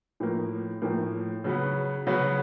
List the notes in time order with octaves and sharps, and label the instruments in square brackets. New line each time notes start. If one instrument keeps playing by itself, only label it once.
[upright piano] A2 F3 A#3
A2 F3 A#3
C#3 F#3 B3
C#3 F#3 B3